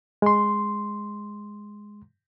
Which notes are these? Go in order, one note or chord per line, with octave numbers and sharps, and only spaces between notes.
G#3 C6